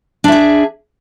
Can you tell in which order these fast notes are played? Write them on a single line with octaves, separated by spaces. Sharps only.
D4 E5 G#4